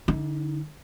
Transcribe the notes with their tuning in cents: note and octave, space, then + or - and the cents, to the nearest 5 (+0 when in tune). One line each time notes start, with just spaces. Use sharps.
D3 +0 D#4 +35